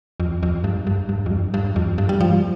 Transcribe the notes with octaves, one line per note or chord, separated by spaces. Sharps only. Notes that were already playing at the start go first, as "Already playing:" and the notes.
F2
F2
G2
G2
G2
F2
G2
G2
F2
G2
G3
F3